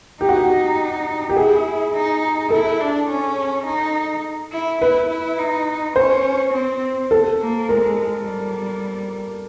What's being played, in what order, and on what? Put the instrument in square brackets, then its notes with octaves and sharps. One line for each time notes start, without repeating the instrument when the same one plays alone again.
[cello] D#4 [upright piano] G4
[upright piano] F#4
G4
G4
[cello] E4 [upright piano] G#4
[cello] D#4
[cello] E4 [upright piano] A4
[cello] D4
C#4
D#4
E4
[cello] E4 [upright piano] B4
[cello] E4
D#4
[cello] C#4 [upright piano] C5
[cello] C4
[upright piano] A4
[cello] A#3
[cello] G#3 [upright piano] A#4
[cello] G3